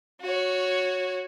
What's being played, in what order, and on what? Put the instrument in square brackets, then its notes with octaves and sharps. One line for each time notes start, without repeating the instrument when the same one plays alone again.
[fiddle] F#4 C#5